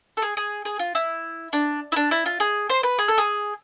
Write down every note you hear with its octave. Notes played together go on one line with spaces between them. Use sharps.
A4
G#4
G#4
G#4
F4
E4
D4
E4
D4
E4
F4
G#4
C5
B4
G#4
A4
G#4